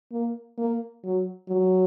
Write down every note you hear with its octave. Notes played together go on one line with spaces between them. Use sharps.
A#3
A#3
F#3
F#3